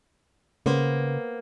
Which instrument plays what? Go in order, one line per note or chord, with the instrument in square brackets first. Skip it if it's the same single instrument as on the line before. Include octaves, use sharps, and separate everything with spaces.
[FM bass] C#3 [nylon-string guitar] A#3 B3 C5